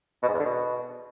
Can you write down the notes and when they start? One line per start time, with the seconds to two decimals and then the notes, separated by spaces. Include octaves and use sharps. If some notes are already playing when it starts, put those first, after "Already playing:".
0.23 B2
0.28 G#2
0.34 E2
0.40 D3
0.45 B2